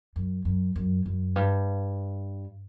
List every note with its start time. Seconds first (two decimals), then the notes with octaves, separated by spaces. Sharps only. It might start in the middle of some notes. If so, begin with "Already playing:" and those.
0.16 F#2
0.45 F#2
0.76 F#2
1.06 F#2
1.36 G2